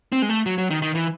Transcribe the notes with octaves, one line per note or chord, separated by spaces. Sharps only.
C4
G#3
A3
F#3
F#3
D#3
D#3
E3